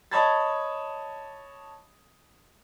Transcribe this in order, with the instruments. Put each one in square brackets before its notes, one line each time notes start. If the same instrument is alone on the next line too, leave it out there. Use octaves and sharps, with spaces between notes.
[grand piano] C#5 D#5 A5 B5 G#6 A6